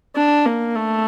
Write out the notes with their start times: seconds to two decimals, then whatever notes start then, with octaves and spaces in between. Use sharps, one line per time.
0.16 D4
0.46 A#3
0.75 A3